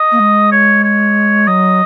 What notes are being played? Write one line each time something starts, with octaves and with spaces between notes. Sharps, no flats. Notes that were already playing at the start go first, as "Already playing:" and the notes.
Already playing: D#5
A#3
G#3
C#5
C#5
F#3 D#5